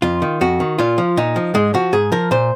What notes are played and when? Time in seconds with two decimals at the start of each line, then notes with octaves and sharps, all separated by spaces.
0.02 F2 F4
0.22 D#3
0.41 F2 F#4
0.60 D#3
0.78 A#2 F4
0.98 F3
1.17 A#2 D#4
1.36 F3
1.55 G#2 G#3
1.74 F3 F#4
1.93 G#2 G#4
2.12 F3 A#4
2.31 A#2 C5